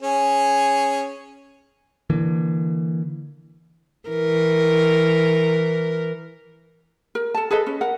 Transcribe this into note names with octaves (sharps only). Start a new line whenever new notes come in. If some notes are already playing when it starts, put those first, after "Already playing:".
C#4 G#4 G#5
D3 E3 A#3
E3 A#4
A#4
A4 A5
G#4 A4 B4 D#5
C#4
A#4 F#5